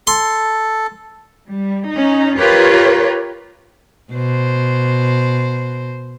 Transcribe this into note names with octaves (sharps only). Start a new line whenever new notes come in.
A4 C6
G3
C#4 D#4
F4 G4 A#4 B4 C#5
B2 C5